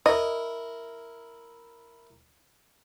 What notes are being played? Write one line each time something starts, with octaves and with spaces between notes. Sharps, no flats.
E4 A#4 D#5